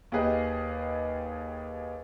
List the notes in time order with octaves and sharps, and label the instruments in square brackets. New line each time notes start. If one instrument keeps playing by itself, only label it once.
[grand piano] D#2 G4 G#4 B4 D#5